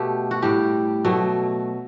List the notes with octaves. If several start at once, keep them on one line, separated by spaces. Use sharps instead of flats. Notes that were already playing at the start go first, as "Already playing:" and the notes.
Already playing: B2 A3 G4
F#4
A2 G3 G4
B2 F#3 A3